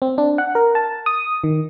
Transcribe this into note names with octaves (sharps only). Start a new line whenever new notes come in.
C4
D4
F#5
A#4
A5
D#6
D#3